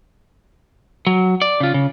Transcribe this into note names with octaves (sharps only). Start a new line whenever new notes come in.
F#3
D5
C#3 F4
C#3